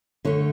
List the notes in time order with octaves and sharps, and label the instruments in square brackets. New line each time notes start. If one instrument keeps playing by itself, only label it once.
[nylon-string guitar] D3 A3 C#5